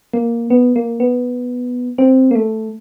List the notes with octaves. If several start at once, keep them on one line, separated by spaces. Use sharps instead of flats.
A#3
B3
A#3
B3
C4
A#3
A3